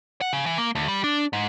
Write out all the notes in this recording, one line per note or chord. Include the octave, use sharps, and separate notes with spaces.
F#5
C#3
E3
A#3
D2
G3
D4
G#2